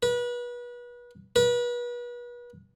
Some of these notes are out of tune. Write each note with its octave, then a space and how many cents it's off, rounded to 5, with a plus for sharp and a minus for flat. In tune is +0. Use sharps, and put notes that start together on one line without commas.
B4 -30
B4 -35